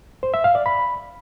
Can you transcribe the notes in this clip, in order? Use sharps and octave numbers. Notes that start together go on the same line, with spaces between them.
C5
E5
F5
D5
B5